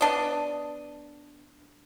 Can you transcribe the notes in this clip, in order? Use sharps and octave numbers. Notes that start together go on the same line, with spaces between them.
B3 D4 D#5